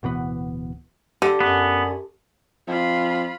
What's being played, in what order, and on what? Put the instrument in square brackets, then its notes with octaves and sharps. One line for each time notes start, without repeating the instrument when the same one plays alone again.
[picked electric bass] D1 B2 E3 B3
[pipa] D3 [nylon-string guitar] G4
[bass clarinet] F#2 [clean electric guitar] B3
[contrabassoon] F2 [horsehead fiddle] F4 B5